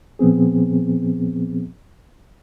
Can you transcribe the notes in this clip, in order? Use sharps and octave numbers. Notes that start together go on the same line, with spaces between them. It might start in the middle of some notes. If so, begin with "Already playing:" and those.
A#2 F3 B3 C4 G#4